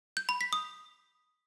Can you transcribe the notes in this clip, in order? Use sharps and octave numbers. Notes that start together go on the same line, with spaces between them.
G6
B5
B6
D#6